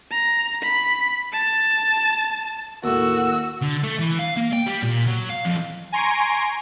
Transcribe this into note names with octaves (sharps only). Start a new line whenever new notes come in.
A#5
B5
A5
D#2 A2 F#4 E6
D3
A3
E3
F5
A#3
G5
G3
A#2
F#3
F5
F2
G#5 A#5 C6 C#6 D7